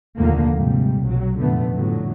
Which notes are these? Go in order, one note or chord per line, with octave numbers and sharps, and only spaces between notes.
F1 D#2 D3 F3 A3 A#3
G#2 C3 G3
B1 F#3
F1 F#2 A#2 D3 A3 B3
F2 A2 D3 F#3